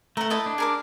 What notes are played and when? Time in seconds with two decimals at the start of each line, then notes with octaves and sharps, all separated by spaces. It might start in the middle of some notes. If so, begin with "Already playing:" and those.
0.17 A3 F#5 A#5
0.30 E4 D#5 A5
0.46 D4
0.58 G#4 A#4 D6